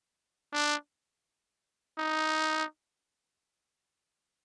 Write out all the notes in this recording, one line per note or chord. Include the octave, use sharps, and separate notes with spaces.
D4
D#4